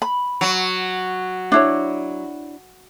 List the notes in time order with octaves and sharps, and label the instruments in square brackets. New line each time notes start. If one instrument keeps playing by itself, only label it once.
[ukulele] B5
[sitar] F#3
[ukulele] D4 E4 C#5